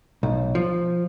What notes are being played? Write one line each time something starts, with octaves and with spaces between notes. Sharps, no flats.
B1
F3